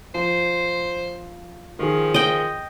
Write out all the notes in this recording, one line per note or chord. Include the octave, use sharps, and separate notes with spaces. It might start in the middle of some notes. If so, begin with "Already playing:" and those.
F3 C5
D#3 F3 G#4
D#5 G5